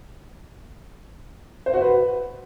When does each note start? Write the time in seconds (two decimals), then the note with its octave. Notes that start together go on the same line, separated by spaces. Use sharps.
1.66 C5
1.74 F#4
1.81 B4